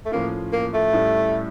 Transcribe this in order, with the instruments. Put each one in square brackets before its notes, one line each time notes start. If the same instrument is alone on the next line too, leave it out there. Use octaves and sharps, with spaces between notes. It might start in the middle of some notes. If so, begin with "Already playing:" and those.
[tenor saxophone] A3
[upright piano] A2 F3 C#4 F4 [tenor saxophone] A#3
[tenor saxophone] A#3
A3
[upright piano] A2 G3 C#4 E4